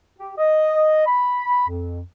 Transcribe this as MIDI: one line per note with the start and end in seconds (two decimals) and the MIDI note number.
0.18 0.33 67
0.38 1.04 75
1.07 1.67 83
1.68 2.01 41